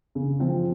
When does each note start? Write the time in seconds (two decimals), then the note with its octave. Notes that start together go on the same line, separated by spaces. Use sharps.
0.15 C#3
0.39 F3 C4 F4